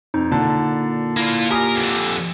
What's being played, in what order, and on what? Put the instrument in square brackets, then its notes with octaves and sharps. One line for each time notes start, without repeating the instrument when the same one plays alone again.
[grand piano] F2 [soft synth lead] D#4
[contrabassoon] A#2 [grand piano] D3 A5
[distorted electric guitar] A#3 F4 [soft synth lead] E4
[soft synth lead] G4 [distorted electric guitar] A#4 [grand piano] G#5 D#6
[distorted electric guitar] F2 D3